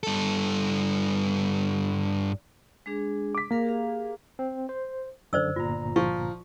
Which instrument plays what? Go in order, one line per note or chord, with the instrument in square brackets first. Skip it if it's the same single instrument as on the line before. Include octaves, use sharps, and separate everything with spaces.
[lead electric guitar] G2 A4
[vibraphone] G#3 D4 G#4
[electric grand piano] D6 B6
[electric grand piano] A#3 [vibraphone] G#4 A#4 F5
[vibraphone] G4 G#4 F5
[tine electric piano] C4
C5
[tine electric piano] F#2 D3 [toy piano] C5 D5 E6
[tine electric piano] G1 A#2 A#5 [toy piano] F4
[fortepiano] F3 [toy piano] C#6